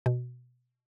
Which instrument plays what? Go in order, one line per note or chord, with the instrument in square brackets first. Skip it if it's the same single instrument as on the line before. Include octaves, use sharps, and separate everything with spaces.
[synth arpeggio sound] B2